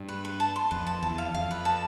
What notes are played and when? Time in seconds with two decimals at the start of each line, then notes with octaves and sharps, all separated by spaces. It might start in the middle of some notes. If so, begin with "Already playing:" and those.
Already playing: G2
0.09 B4
0.25 B4
0.40 A5
0.56 C6
0.71 F2 B4
0.87 A5
1.02 E2 A5
1.18 F5
1.34 F2 F5
1.51 B4
1.65 A5